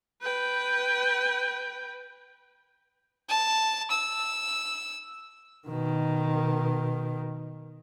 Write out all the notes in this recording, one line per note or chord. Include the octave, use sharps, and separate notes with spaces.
B4 G5
A5
E6
B2 D#3